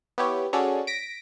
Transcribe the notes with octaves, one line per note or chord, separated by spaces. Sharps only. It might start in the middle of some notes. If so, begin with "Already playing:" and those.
B3 E4 G4 C#5
C#4 F#4 G#4 A4 C#5 D5
A#6 B6 D7